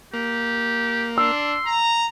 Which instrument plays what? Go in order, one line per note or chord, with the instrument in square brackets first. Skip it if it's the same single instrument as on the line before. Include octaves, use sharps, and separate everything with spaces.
[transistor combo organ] A#3 [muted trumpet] G4
[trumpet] D4 [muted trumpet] C6 [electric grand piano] E6
[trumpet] A#5